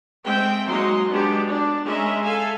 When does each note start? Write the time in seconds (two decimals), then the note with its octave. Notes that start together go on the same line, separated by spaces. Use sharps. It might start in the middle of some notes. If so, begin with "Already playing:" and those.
0.24 G#3 C4 E5 G5
0.67 F#3 G#3 A#3 D#4 D#5 C6
1.09 G#3 B3 D4 F#4 G4
1.49 D4
1.85 G#3 C#4 A#4 D#5 E5
2.23 A4 E5 F5 G#5